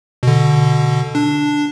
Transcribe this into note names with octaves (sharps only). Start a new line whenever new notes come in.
B2 D3
D4